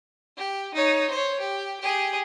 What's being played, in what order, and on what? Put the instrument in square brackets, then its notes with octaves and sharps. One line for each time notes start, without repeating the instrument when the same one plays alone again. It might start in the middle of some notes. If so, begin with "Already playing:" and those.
[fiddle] G4
D#4 C#5
C5 C#5
G4
G4 G#4